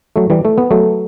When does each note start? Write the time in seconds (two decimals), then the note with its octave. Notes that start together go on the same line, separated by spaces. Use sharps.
0.16 F#3 A3
0.30 E3 G3
0.45 A3
0.58 B3
0.71 F#3 A3